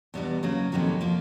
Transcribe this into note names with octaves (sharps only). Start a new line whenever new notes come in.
E2 B2 G3 B3 D4
C#3 F#3 A#3
F2 C3 D#3 F#3 A#3
F3 A#3